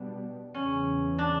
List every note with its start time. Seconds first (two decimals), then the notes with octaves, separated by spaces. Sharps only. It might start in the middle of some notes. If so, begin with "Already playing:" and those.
Already playing: B2 G3 B3 D4
0.54 E2 C#3 E3 C#4
1.18 D4